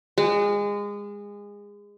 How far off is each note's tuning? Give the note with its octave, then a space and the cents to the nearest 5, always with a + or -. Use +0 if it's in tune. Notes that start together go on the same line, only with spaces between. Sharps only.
G#3 -25